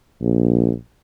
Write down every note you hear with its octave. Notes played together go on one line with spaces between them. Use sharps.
A#1